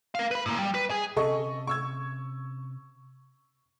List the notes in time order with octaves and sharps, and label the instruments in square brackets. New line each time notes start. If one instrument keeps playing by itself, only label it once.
[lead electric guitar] A#4 F5
B4 B5
A2 A#3
G3
B4
G#4 G#5
[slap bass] C3 C#4 [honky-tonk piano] A4 D#5 C#6
[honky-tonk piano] C#6 E6 G#6